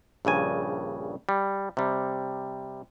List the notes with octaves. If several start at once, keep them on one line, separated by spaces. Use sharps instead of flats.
A#1 G2 C#3 G#5
G3
C3 G3